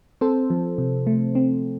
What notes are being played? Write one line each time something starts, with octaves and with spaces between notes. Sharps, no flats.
C4 A4 C5
F3
C3
A3
C4